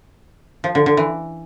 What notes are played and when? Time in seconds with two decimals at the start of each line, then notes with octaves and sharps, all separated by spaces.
0.64 F3
0.75 D3
0.86 D3
0.97 E3